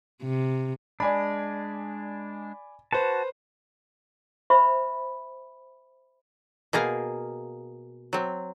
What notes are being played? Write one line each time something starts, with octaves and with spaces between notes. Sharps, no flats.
C3
G#3 D4 D5 G#5 B5
F#4 B4 C5 A5
C5 E5 B5 C#6
B2 A#3 G#4 A#4 F5
F#3 C4